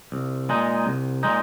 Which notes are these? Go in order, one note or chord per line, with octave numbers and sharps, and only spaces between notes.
C2
A#2 G#3 D#4
C2
A#2 G#3 D#4